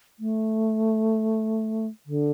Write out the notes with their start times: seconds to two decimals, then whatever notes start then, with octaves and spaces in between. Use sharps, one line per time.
0.19 A3
2.06 D3